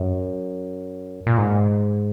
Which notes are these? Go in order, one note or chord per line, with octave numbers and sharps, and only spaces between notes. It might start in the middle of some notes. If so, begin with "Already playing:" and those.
Already playing: F#2
A#2
G#2